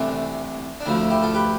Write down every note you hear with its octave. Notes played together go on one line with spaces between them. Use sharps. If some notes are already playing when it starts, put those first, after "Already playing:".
Already playing: C2 C3 E3 A3 D4
D4
D2 D3 F3 A3 E4
E4
E4 G4
F4 A4
G4 B4